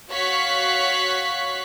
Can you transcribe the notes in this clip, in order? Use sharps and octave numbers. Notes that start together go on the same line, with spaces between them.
F#4 C#5 F5 C#6 F#6 B6